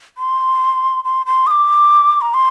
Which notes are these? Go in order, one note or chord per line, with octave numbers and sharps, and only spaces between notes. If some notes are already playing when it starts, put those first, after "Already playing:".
C6
C6
C6
D#6
D6
A#5
C6